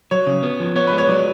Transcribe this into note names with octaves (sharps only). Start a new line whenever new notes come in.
F#3 C#5
C#3
B3
F3
B3 C#5
G#3 B4
C#5
F#3 D5